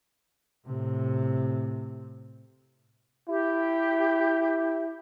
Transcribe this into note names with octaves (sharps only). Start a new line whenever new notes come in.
A2 C3
E4 G4